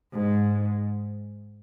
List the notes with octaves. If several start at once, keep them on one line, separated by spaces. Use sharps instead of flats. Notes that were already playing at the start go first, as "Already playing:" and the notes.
G#2